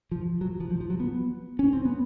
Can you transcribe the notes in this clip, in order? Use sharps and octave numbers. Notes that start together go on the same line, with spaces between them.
F3
F#3
F3
F3
F3
F#3
B3
C#4
C4
B3